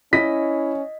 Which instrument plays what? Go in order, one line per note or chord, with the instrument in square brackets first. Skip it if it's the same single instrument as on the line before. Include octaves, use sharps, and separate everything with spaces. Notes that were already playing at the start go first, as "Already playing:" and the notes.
[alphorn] C#4 [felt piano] E4 [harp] D#5 [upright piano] B6